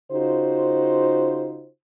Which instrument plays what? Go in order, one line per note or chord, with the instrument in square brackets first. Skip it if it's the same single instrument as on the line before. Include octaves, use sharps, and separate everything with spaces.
[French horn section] C#3 D#4 F4 F#4 C5